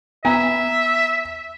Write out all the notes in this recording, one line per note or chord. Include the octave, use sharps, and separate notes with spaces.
B3 E5 G#5 A#5